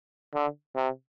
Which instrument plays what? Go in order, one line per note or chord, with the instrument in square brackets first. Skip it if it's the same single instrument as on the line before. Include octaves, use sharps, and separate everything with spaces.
[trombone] D3
C3